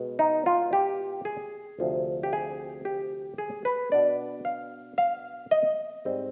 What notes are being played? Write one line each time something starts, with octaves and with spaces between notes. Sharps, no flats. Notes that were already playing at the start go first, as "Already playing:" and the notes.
Already playing: B2 G#3
D#4
F4
G4
G#4
D2 C3 F3 C4
G4
G#4
G4
G#4
B4
B2 B3 D4 D5
F5
F5
D#5
G#2 G3 C4